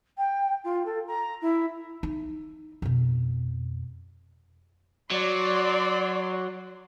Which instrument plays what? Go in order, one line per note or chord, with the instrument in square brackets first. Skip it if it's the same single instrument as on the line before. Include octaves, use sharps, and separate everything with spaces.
[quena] G5
F4
A4
A#5
E4
[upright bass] D#4
F2 B2
[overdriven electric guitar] F#3 [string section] D5 C6